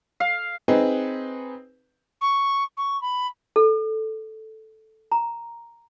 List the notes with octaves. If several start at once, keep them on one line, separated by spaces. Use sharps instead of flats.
F5
C4 D#4 G#4 B4
C#6
C#6
B5
A4
A#5